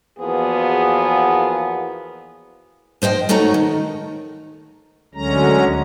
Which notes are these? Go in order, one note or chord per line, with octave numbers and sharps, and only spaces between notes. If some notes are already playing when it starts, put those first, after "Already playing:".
E2 F3 A#3 B3 F#4 G#4
F3 C5 D#5 G5
G#2 A3 C#4 D#4 F#4 A#5
D#3
D2 D3 F#3 G#3 C#4 A#5